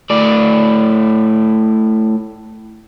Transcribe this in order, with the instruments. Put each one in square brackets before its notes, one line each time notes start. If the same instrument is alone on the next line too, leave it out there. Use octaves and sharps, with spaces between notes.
[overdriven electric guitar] A2 D5